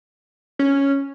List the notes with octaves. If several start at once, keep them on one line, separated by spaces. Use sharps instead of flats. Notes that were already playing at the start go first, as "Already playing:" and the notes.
C#4